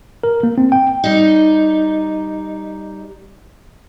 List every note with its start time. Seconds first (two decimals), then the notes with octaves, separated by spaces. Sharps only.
0.23 A#4
0.43 A#3
0.58 C4
0.72 G5
1.04 G3 D#4